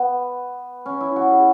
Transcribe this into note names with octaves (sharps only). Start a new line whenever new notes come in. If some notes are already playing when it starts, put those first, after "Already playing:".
Already playing: B3
C#4
E4
F#4
G#4